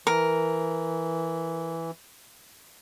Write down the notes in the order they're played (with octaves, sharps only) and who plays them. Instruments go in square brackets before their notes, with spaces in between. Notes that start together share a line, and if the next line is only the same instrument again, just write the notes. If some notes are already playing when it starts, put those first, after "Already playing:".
[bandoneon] E3 [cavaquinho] A#4